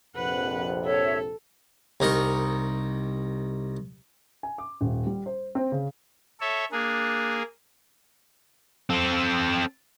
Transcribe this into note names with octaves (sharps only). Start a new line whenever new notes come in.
A#1 F2 C3 B4 F#5
A4 C#5 E5
C2 D#4 A#4 C#6
G#5
D6
D#1
G3
C5
C4
C#3
A4 C#5 E5
A#3 D4 G#4
C4 A4